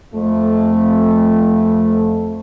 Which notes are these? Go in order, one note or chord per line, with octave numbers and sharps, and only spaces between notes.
F2 A3